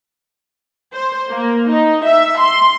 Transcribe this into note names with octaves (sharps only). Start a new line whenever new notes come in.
C5
A#3
D#4
E5
C6